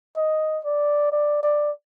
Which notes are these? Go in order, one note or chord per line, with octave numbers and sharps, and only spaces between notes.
D#5
D5
D5
D5